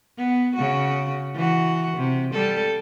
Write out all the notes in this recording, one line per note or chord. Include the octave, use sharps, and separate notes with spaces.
B3
C#3 F#4
E3 F#4
C3
G3 A4